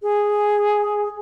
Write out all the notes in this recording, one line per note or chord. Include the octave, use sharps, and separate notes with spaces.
G#4